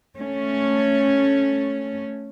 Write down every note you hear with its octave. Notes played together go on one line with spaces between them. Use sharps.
A3 C#4